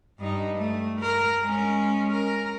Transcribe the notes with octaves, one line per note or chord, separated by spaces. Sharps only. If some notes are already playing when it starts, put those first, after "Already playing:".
G2 D#4
A3
A#4
G#3 C#4
A#4